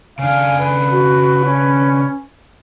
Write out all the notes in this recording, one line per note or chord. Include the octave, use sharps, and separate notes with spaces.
C#3 D4 F5 G#5
B4
F#4
C#4